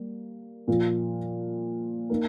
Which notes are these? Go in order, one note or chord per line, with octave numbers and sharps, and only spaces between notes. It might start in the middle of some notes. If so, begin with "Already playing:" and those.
Already playing: G3 A#3
A#2 F3 A#3
A#3 D#4 A#4